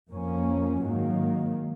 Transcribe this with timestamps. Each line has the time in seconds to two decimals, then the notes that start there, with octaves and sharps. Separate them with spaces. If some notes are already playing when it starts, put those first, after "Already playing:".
0.10 F2 F3 A#3 C#4
0.82 G#2 D#3 F#3 A#3